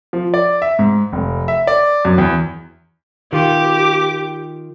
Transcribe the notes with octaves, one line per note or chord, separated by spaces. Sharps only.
F3
D5
E5
G#2
F1
E5
D5
F#2
E2
D#3 F4 G4 D6